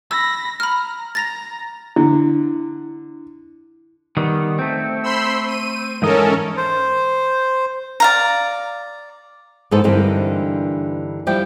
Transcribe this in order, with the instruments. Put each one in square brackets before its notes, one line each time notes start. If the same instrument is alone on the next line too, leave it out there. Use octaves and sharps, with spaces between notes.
[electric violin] B5 A#6 [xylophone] E6
[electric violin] A#5 [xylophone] B5 F6
[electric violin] A#5 [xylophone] A6 A#6 F7
[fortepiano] D3 [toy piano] E4
[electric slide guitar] D#3 G3 B3
A3 C4
[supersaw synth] B5 C6 E6
D#7
[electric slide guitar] G#2 E3 D#5 [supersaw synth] C#4 A4 A#4
[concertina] C5
[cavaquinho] D5 F5 A#5
[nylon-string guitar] G#2 E3 B3 D#4 A4 C5
G2 D3 E3 C4 D#4 A#4
F3 G3 E4 G4